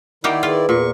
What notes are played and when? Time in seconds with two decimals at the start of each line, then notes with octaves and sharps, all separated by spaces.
0.24 D#3 A#3 D#4 E4 G4 D5 F#5
0.43 F4 G#4 B4
0.69 E2 A#2 C#6